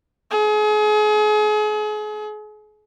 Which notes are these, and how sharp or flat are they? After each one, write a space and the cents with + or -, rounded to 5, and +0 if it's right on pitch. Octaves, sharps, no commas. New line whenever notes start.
G#4 +35